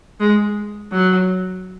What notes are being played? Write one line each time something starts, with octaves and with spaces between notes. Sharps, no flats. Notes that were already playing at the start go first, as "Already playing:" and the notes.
G#3
F#3